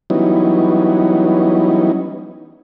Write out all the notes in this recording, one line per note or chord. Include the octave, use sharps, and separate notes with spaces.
E3 F#3 G3 B3 C#4 D#4